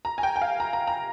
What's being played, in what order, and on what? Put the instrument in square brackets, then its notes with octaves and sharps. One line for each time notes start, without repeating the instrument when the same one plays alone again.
[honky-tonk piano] A#5
G#5
G5
G5
F5
A#5
A#5
A#5